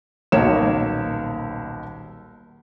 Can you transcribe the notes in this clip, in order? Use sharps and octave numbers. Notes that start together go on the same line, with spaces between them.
D#1 B1 B2 A#3 C#5 E7